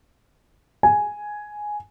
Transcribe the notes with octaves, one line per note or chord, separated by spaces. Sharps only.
G#5